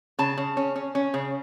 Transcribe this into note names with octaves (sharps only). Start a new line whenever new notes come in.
C#3 A5
C#3
C#4
C#4
C#4
C#3